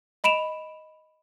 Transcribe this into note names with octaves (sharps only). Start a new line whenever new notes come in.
D#5 B5 D7 E7 F7